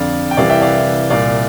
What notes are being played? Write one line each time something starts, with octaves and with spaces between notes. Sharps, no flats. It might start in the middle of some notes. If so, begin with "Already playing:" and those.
Already playing: F2 D3 D5 F5
G5
C2 C3 E3 D5 F5
E5 G5
D5 F5
C2 A#2 D5 F5